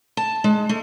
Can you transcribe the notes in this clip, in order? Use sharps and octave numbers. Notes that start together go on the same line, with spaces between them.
A5
G#3
A3